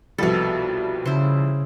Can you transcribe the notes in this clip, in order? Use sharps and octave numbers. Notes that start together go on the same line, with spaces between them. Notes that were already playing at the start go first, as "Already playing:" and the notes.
C2 B2 F3 G3 A4
C#3 E4 C5